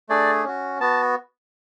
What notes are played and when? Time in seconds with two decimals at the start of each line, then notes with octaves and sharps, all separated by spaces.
0.09 A3 D4 G#4 D5
0.44 C#4 F#4
0.80 B3 F#4 A5